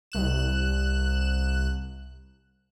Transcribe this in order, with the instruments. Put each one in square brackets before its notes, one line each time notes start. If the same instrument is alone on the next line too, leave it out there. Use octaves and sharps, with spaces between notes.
[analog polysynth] C2 F#6 E7